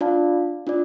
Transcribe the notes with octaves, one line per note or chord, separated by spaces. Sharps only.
D4 F4 D5 F5 A5
D4 F4 D5